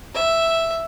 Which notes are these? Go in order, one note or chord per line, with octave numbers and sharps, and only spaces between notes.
E5